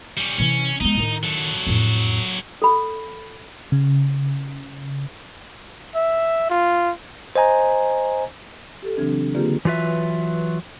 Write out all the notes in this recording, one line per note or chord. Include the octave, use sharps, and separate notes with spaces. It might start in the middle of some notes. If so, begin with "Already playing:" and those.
G3 C#4
C3 E3 C#4
G#3 B3 D#4
A2 D#3
F#3 A4
F2 A2
A4 B5
C#3
E5
F4
C5 D#5 G#5 A#5
G4 A4
C#3 E3 F#3 C4 D4
D3 A#3 F4 G4 G#4 B4
E3 F#3 F4 B4 E5